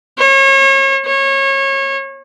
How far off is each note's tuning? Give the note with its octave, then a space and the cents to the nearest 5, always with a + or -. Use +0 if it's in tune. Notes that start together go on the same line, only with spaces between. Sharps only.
C#5 -35
C#5 -25